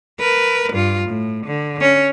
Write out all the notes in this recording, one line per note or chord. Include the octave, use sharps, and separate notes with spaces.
A#4 B4
G2 F4
A2
D3
C#4